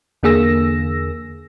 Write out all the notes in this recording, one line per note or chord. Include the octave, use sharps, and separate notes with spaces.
E2 D3 A#3 G#4 E6 A#6